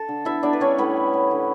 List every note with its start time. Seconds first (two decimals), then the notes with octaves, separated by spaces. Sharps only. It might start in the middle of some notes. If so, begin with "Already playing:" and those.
Already playing: A4 A5
0.09 D3
0.25 B3 E4 E5
0.43 B3 D4 D5
0.53 B4
0.60 G3 C#4 C#5
0.78 A2 B3 B4
0.96 E3
1.13 C#4
1.31 D3